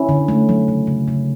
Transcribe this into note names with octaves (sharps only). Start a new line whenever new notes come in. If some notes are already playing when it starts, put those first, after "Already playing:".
Already playing: C#4 E4
D3
A3
F#3
C#3
C#3
C#3